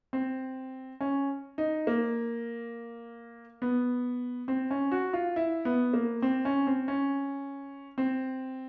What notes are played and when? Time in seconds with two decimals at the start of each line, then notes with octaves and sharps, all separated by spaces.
0.13 C4
1.01 C#4
1.58 D#4
1.87 A#3
3.62 B3
4.48 C4
4.71 C#4
4.92 F#4
5.13 F4
5.36 E4
5.65 B3
5.94 A#3
6.22 C4
6.45 C#4
6.67 C4
6.88 C#4
7.98 C4